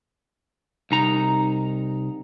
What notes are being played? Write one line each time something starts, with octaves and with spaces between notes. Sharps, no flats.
C2 D#4 A#5